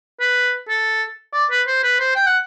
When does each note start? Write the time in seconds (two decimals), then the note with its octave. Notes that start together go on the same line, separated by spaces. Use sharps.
0.20 B4
0.69 A4
1.33 D5
1.51 B4
1.67 C5
1.83 B4
2.00 C5
2.16 G5
2.27 F#5